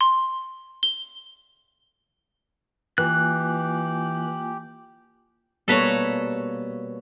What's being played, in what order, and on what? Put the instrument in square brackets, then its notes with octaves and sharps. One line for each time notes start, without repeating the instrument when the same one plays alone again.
[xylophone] C6
G7
[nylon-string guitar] E3 [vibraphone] A#3 F4 G#5 [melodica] G4 [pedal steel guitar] F#6
[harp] B2 [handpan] G3 A#3 C#5 [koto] A4 B4 A#5